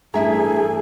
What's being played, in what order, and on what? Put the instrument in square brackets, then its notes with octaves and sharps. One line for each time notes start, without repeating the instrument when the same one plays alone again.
[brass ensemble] A1 G2 [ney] A3 [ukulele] E4 E5 A#5 [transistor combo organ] G#4